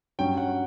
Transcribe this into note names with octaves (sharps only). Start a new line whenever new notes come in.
G2 F#3 C#4 G5
F#5